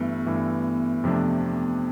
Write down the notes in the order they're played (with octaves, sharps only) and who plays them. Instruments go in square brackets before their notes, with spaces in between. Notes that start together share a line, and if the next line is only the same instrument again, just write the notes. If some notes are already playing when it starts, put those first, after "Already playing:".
Already playing: [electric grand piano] G2 E3 A3 [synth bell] B3
[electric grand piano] G2 E3 A3
F2 C3 F3 A3 D4